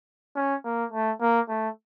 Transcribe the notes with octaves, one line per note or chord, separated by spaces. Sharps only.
C#4
A#3
A3
A#3
A3